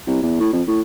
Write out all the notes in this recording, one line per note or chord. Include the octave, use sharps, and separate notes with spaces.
C2
E2
A2
F2
A2